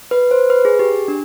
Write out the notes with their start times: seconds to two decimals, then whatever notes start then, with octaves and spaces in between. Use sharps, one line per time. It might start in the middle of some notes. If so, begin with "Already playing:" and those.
0.11 B4
0.31 C5
0.50 B4
0.65 G#4
0.79 G4
1.08 D4